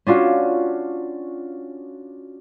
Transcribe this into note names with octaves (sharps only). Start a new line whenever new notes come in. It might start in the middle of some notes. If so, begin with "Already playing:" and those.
C#4 D4 F4 F#4